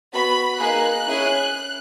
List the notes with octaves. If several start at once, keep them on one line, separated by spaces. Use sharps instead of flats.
B3 F#4 B5
A#3 D#4 G#4 F#6
C#4 E4 G#4